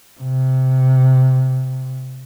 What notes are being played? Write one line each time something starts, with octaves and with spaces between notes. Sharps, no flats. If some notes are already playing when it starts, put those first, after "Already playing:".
C3